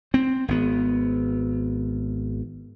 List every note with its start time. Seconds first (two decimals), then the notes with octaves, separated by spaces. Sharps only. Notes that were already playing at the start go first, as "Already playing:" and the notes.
0.14 C4
0.48 G#1 B3